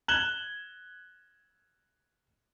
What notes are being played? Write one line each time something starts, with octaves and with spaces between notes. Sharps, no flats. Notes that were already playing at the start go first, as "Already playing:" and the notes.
F#6 G#6 E7 F#7 G7